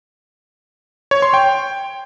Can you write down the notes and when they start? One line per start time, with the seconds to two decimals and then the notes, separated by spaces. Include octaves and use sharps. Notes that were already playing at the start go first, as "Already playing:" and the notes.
1.11 C#5
1.22 C6
1.34 G5